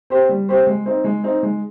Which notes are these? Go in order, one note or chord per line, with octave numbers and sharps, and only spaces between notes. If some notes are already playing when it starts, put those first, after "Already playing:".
C4 G4 C5
G3
C4 G4 C5
G#3
C4 D#4
G#3
C4 D#4
G#3